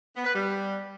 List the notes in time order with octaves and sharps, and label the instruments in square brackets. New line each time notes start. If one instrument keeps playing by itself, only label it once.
[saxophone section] B3
B4
G3